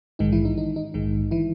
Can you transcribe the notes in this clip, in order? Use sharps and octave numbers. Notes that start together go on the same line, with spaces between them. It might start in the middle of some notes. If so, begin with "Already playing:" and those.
A#1 G#2 D#3 G#3 D#4
E3 E4
D#4
D#4
D#4
A#1 G#2 D#3 G#3
E3 E4